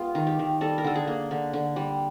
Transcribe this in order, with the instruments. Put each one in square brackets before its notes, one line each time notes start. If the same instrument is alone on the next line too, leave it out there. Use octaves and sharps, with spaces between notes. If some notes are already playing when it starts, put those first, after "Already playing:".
Already playing: [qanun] G#3 B3 F4 G4
D#3
G4
D#3
G3 A4
A#4
D3 A4
G#4
A#3
D3
D3
G3